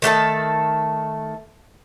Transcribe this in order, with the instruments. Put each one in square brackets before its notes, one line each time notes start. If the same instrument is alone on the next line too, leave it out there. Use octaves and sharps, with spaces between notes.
[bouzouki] D#3 A3 A4 A5